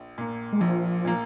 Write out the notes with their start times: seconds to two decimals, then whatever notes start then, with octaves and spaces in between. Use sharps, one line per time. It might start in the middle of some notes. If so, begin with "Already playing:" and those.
Already playing: A#1
0.18 A#2 A#3
0.52 G#3
0.61 A#1 F3
1.05 A#2 A#3